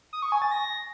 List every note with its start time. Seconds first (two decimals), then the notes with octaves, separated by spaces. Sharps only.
0.13 D#6
0.22 C#6
0.32 G#5
0.42 A6
0.51 A#6